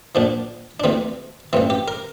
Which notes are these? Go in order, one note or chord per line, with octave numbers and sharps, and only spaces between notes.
A#1 A#2 F3 D4
D4
D2 C3 E3 C4
A1 G2 E3 C4
G4
A#4